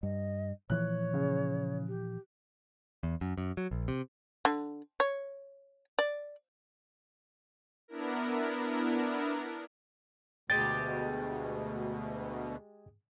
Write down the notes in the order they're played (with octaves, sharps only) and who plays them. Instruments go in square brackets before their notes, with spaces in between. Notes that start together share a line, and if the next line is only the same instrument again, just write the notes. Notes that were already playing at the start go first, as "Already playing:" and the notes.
[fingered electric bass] G2 [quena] D#5
[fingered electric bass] A#2 E3 F3 [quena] C#5 [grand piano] F#6
[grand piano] C#3
[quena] G4
[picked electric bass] E2
F#2
F#2
F#3
A#1
C3
[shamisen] D3
C#5
D5
[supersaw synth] B3 D4 E4 A#4
[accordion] D2 B2 [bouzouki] G#3 G4 [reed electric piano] A6